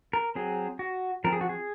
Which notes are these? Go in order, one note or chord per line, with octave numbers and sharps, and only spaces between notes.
A#4
F#3 C4 G#4
F#4
F3 C4 A#4
G#4
F#4
G#4